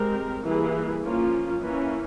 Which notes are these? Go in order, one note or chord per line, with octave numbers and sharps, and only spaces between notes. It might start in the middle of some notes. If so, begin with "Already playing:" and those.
Already playing: G#3 C4 G4 A#4
E3 G3 A#3 E4 G#4
F3 A#3 C#4 F4
E3 A#3 C#4